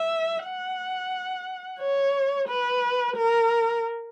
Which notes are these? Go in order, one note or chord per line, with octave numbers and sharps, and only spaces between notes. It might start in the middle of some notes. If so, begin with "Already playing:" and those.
Already playing: E5
F#5
C#5
B4
A#4